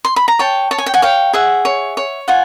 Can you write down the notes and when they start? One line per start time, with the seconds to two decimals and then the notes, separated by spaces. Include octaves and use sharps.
0.05 C6
0.16 B5
0.28 A#5
0.39 C#5 G5 A5
0.71 C#5 A5
0.78 G#5
0.86 G5
0.94 F#5 G#5
1.02 C#5 F5 G5
1.33 G#4 E5 F#5
1.65 C#5
1.97 C#5
2.28 F4 F#5 G#5